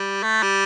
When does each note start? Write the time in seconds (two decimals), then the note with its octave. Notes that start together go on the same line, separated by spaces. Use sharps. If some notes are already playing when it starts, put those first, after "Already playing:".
Already playing: G3
0.23 A3
0.43 G3